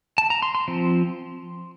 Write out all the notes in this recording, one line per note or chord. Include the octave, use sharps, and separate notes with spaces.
A5
A#5
C6
C6
F3 C4